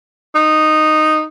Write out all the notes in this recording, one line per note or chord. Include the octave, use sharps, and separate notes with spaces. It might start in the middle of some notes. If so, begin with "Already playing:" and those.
D#4